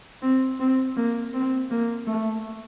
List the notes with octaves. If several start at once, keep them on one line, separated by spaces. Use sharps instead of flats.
C4
C4
A#3
C4
A#3
A3